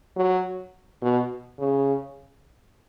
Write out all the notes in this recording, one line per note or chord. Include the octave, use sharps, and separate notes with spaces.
F#3
B2
C#3